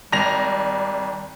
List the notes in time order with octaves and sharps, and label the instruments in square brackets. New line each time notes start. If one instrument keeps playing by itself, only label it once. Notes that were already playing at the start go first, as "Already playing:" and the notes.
[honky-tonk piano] G#1 A#6 F7 [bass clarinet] G3